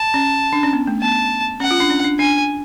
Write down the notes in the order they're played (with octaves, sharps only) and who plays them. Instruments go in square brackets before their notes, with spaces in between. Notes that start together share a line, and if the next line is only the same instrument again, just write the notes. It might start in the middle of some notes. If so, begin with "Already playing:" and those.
Already playing: [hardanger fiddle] A5
[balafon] C#4
D4
C#4
B3
A3
[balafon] B3 [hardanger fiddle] A5
[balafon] C#4 [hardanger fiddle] F#5
[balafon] F4
D4
C#4
D4
[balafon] D4 [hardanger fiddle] G#5